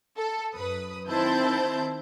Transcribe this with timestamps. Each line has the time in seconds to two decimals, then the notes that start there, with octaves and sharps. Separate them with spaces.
0.18 A4
0.55 F#2 B4 D#6
1.09 D#3 C4 E4 C5 A5 G6